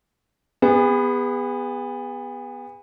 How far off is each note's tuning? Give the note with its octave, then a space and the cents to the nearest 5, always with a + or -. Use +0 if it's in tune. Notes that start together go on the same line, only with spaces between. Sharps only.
B3 +0 G#4 -40